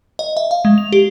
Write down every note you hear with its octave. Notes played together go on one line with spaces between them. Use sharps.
D#5
E5
F5
G#3
F7
G4